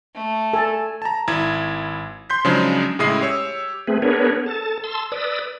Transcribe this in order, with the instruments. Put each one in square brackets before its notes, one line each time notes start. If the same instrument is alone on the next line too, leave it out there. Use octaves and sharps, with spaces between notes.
[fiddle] A3
[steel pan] A4 A5 [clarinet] G#5
[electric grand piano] A5 A#5
G#1 E4 G#6
C6 G6 B6
C#3 F3 F#3 G#3 D4 D#4
A2 C#3 G#3 E4 D#6 C7
G4 C#5 E6
[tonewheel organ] A3 C4 G#4 B4
B3 D4 G#4 A#4 B4 C#5
A4 A5
A5 C6 E6
B4 D5 D#6 E6